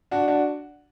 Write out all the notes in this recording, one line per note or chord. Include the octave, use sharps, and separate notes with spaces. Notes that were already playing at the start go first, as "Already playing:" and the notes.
D4 F#4
D4 F#4